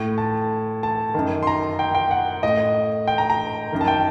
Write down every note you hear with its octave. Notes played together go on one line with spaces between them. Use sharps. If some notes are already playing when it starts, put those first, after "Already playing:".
Already playing: A2
A5
A5
F#2 D#3
C6
A#5
G5
G5
F#5
A2 D#5
G5
A#5
A#5
F#2 D#3
A5
G5